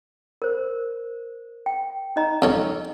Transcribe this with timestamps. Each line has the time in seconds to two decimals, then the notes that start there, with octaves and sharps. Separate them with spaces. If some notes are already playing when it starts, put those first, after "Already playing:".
0.42 A#4 C5
1.66 G5
2.16 D#4 D#5 A#5
2.42 F2 C#4 C#5